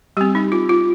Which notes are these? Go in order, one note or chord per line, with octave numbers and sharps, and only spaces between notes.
G3 C4 G4
D#4
F4
F4